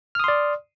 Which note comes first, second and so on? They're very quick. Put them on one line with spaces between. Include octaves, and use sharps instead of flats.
F6 D#6 C6 D5